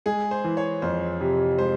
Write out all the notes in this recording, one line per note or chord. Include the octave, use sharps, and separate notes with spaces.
G#3 G#4
C5
E3
C#5
F2 C5
C3
G#3 C5